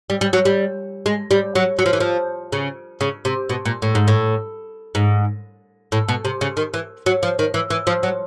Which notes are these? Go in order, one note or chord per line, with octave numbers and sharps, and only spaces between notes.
G3
G3
F#3
G3
G#3
G3
F#3
F#3
F3
E3
F3
C#3
C#3
C3
B2
A#2
A2
G#2
A2
G#2
A2
B2
C3
C#3
D#3
E3
F#3
F3
D#3
E3
E3
F3
F#3